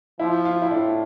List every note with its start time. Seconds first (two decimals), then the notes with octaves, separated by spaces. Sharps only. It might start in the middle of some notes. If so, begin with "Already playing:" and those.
0.20 F3 E4
0.45 F4
0.62 E4
0.71 A2 D4